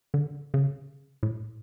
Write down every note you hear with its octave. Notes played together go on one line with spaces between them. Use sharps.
D3
C#3
A2